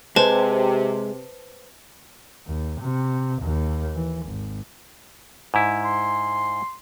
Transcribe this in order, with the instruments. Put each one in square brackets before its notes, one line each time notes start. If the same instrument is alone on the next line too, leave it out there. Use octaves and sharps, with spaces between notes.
[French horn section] C3 [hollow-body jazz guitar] G#3 [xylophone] B4 C5 A5
[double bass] D#2
C3
D#2
E3
G#1
[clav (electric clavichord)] G#2 E4
[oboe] C6